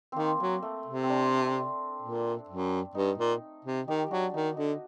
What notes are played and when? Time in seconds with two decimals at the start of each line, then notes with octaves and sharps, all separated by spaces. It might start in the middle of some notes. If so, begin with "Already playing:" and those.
0.12 D#3 A#3 C4
0.40 F#3 A#3
0.62 A3
0.86 C3
1.03 C4
1.09 D4
2.02 A#2
2.48 F#2
2.95 G2 D#4
3.18 A#2
3.65 C3
3.87 D#3 D#4 G4
4.04 G4
4.11 F#3 D4 F#4
4.34 D#3 D#4
4.57 D3 D#4